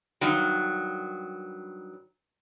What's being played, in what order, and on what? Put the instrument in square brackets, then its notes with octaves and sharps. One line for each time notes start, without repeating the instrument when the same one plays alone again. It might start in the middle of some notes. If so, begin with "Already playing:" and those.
[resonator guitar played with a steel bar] G2 D#3 F#3